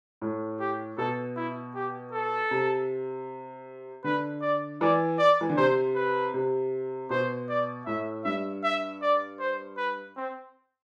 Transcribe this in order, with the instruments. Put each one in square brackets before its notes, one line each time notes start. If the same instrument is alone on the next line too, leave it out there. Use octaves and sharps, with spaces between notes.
[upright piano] A2
[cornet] G4
[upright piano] B2 [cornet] A4
[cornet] E4
G4
A4
[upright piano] C3
[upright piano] D3 [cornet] B4
[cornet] D5
[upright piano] E3 [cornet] D5
[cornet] D5
[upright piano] E3
D3
[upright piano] C3 [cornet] C5
[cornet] B4
[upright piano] C3
[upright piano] B2 [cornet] C5
[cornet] D5
[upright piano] A2 [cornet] E5
[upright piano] G2 [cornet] E5
[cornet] E5
D5
C5
B4
C4